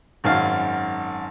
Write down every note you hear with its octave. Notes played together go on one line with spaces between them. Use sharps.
G#1 F#2 F5